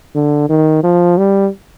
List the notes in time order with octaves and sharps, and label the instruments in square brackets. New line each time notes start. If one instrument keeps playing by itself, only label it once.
[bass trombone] D3
D#3
F3
G3